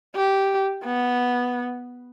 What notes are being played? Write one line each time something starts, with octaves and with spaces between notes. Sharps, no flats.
G4
B3